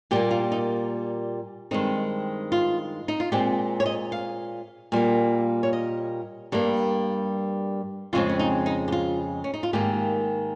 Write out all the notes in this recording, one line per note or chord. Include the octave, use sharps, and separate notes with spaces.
A#2 G3 A#3 G4
F4
D#4
G2 D#3 G#3 C4 D#4
F4
D#4
F4
A#2 G#3 C4 G4
C#5
D#5
F5
A#2 G3 A#3
C#5
D#5
G2 G3 A#3
F2 C#3 G#3 C4 F4
C#4
D#4
D#4
G4
F4
C#4
D#4
F4
G#2 D#3 A#3 G4